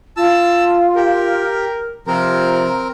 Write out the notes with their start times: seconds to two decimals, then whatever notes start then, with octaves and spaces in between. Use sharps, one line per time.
0.17 F4 A5 E6
0.96 G4 A#4
2.07 C3 F3 C4 A#4 A#5